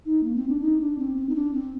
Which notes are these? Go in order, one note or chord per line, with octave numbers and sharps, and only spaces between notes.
D#4
A#3
C4
D4
D#4
D4
C4
C4
D#4
D4
C4